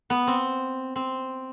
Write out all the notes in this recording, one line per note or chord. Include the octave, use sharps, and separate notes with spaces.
B3
C4
C4